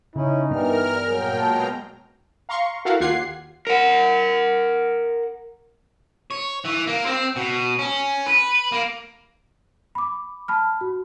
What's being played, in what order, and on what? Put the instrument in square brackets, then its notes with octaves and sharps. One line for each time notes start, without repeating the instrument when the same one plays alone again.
[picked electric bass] C#3 [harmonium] C#4 E4 [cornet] D#4
[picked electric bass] G2 B3 D4 [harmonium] E3 G3 [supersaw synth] A#4 F6
[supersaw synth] A#2 G5 [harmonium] F#3 [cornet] G#4
[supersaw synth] B2 G#3 A#5 [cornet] A5
[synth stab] F5 A#5 C6 C#6
E4 F#4 A4 A#4 F5 F#5
D#2 F4 G4 F#5 G#6 C7
[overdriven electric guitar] A#4 F#5
C#5
E3
A#3
C4
B2
C#4
B4
A#3
[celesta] B5 D6
A5 B5 F6
F#4